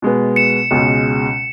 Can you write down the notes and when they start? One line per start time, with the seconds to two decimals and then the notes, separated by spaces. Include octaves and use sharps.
0.02 B2 G#3 B3
0.36 C#7 E7
0.71 C#2 B2 G#3